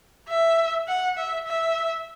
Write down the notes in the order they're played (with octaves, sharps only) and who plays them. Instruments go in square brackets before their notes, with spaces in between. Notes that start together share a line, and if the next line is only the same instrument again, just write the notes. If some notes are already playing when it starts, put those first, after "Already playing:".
[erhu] E5
F#5
E5
E5